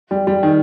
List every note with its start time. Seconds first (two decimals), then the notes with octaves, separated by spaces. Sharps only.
0.11 G3
0.27 G3
0.43 D#3